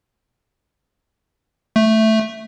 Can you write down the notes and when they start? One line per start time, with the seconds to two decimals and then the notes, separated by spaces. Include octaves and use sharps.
1.76 A3